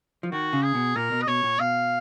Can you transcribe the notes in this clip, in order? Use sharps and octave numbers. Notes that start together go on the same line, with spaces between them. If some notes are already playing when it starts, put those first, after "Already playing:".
F3
D#3 F#4
C#3
G#4
B2
A#2 A#4
B2
D#5
B2 C#5
A#2
B2 F5